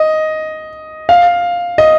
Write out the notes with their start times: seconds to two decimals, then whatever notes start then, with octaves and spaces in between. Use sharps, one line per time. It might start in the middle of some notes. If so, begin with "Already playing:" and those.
Already playing: D#5
1.09 F5
1.78 D#5